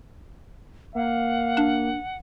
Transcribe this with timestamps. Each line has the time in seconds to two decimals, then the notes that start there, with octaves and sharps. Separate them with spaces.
0.95 A#3 F5 F#5
1.57 D4